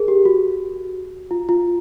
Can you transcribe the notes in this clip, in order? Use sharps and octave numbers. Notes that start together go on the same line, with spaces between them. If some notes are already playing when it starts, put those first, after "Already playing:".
Already playing: G#4 A#4
G4
F#4
F4
F4